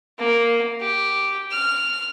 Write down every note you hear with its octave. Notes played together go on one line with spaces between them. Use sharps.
A#3
G4
F6